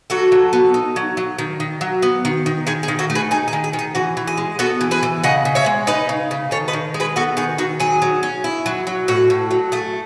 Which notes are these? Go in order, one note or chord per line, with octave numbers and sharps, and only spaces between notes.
F#3 F#4 A4
F#3
B3
D#4
F#3
F#3
D#3
D#3
F#3
B3
D#3
D#3
D#3 G#4
G#4
D#3
F#4 A4
A3
G#4 B4
D#4 G#4
G#4
D#3
G#4
D#3
G#4
E3 F#4
E3
G#4
G#3
B3 F#4 A4
E3
G#4 B4
E3
C#3 D#5 F#5
C#3
C#5 E5
G#3
D#4 B4 D#5
C#3
C#3
D#3 A4 C#5
B4 D#5
D#3
G#3
G#4 B4
B3 F#4 A4
D#3 G#4
D#3 F#4
F#3 G#4
F#3
C#4
E4
F#3
F#3
A2 F#4
A2
F#3
A3 G#4